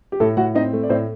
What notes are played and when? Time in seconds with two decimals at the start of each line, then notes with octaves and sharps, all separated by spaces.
0.12 G4
0.20 A2 A3 A4
0.37 A2 F#4 F#5
0.55 C4 D#4 D#5
0.73 A3
0.83 D5
0.90 A2 C4 C5